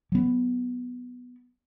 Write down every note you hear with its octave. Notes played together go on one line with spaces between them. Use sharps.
F#3 B3